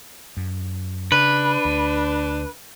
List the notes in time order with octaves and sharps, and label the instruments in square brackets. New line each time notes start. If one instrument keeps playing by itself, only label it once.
[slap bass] F#2
[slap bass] C#3 [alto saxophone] D4 [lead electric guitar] B4
[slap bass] D2